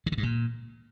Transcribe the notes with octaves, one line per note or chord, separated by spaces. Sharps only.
D#3
D3
G2
A#2